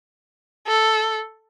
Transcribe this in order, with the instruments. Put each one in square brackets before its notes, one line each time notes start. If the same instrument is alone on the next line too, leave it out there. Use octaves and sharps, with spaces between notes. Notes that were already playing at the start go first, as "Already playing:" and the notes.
[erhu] A4